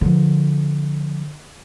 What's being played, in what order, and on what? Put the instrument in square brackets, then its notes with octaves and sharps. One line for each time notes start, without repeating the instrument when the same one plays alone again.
[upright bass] D3 F3